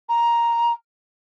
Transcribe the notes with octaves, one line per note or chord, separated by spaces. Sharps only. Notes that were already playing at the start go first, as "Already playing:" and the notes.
A#5